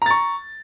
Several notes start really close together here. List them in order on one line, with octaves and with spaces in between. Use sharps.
A#5 A6 C#6